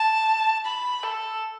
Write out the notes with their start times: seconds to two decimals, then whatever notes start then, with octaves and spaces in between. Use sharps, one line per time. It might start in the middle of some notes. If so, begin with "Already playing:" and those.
Already playing: A5
0.65 B5
1.03 A4